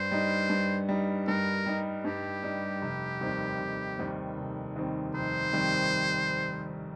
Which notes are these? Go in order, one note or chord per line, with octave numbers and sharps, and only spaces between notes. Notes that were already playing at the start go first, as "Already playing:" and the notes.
Already playing: G2 C5
G3 D#4
G2
G3 D#4
G2 A#4
G3 D#4
G2 G4
G3 D#4
F1
D#2 D#3 G3 C4
F1
D#2 D#3 G3 C4
F1
D#2 D#3 G3 C4
F1 C5
D#2 D#3 G3 C4